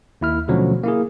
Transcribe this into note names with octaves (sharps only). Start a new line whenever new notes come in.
D#2 E4 F6
B2 D3 F3 F#3 A3 C#4
A#3 E4 G#4